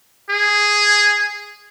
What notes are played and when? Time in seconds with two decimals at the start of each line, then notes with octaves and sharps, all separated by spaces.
0.30 G#4